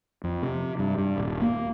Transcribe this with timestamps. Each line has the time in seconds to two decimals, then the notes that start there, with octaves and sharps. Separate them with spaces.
0.24 F2
0.43 C3
0.79 G2
0.97 G2
1.18 D#1
1.42 A#3